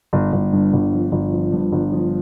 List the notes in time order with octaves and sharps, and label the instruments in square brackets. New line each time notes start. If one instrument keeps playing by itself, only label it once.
[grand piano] G1
G1
G2
G1
F3
G1
F3
G2
G1
F3